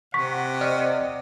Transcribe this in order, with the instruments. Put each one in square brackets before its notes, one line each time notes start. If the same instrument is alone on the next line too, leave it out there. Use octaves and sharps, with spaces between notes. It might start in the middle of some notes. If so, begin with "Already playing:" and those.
[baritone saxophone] C3 [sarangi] F#5 [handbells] C#6 B6
[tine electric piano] D5 D#5 F6